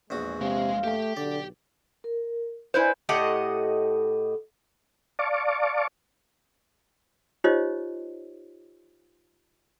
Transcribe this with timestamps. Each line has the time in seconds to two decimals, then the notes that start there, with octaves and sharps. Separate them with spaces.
0.10 A#1 E2 G#3 F#4 G#4
0.41 C3 G#3 F5
0.84 A3 G4 G5
1.17 B1 D3 D5
2.04 A#4
2.74 E4 B4 C5 D5 D#5 G#5
3.09 A2 G4 D#5 F#5
5.19 D5 F5 A5 C#6 D6
7.44 D#4 F4 G4 C5 C#5 D#5